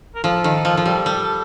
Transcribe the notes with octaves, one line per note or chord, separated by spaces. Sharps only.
A#4
F3 A4
D#3
F3
F3
G3
G3